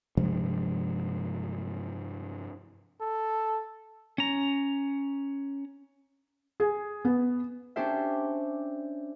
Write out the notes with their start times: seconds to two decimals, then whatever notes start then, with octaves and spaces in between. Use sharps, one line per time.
0.17 G2 C3 F3 G#3
3.01 A4
4.18 C#4 A#5
6.60 G#4
7.05 B3
7.76 C#4 D4 G4 C5 E5